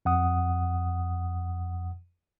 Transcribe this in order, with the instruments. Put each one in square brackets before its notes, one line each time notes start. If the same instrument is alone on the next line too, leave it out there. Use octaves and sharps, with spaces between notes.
[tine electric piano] F2 F#5 D#6